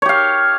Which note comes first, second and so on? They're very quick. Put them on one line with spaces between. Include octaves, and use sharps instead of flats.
C#5 G4 F5